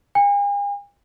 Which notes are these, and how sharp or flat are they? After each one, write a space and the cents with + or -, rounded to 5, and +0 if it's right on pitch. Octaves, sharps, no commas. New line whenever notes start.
G#5 -45